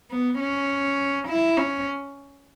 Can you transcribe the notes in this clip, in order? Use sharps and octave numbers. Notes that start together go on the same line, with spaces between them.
B3
C#4
E4
C#4